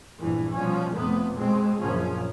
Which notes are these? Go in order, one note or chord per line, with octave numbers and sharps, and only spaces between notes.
A#1 E2 G2 E3
B2 F3 G3 C#4
F1 C3 A3 B3
B2 G#3 C4
A#1 F#2 C#3 F3 C#4